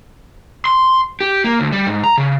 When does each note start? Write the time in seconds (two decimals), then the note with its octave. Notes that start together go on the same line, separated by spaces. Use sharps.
0.65 C6
1.21 G4
1.44 A#3
1.60 D2
1.72 G3
1.87 G#2
2.04 A#5
2.18 C#3